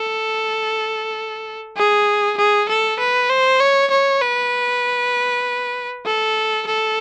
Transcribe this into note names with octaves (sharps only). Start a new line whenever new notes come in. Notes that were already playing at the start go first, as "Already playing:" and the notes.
Already playing: A4
G#4
G#4
A4
B4
C5
C#5
C#5
B4
A4
A4